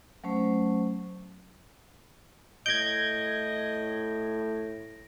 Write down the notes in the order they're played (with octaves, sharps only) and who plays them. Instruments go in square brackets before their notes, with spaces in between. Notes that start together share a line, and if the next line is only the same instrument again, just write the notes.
[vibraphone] F#3 A3 C#4 C5 A5
[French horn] A2 [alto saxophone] D#5 [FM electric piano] G6 G#6 [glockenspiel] A#6 D7